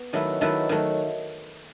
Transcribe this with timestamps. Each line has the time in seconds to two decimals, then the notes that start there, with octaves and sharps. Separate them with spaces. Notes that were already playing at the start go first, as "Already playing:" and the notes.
Already playing: B3
0.13 D#3 F#3 A3 E4 B4
0.41 D#3 F#3 A3 E4 B4
0.69 D#3 F#3 A3